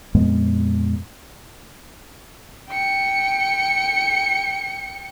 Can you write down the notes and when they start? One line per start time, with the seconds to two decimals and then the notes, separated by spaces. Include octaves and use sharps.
0.15 F2 A#2 G#3 B3
2.69 G5 C#7